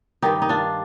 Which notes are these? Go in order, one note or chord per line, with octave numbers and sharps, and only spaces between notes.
G2 D#3 G3 D#4 G4
D#4
D4 F4